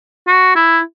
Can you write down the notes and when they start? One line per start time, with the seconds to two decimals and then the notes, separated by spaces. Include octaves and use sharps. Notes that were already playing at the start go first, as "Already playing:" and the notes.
0.27 F#4
0.56 E4